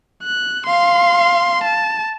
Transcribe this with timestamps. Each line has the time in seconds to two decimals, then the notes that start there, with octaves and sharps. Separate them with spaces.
0.23 F#6
0.67 F5 C6
1.64 A5